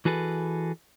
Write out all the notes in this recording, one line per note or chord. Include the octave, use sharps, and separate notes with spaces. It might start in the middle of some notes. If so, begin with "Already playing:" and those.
E3 F#4 G#4 A4 B4